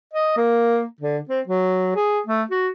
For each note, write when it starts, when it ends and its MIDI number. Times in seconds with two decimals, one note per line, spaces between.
0.13 0.33 75
0.37 0.84 58
1.01 1.18 50
1.29 1.41 60
1.47 1.95 54
1.96 2.20 68
2.27 2.43 57
2.51 2.69 66